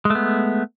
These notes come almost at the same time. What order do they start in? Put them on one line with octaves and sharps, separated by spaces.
G#3 A3 B3